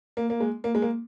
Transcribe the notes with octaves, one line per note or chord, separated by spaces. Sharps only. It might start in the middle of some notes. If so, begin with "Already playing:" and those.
A#3
A#3
G#3
A#3
G#3
A#3